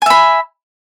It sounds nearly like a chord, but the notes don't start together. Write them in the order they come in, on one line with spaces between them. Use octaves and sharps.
G#5 E5 B5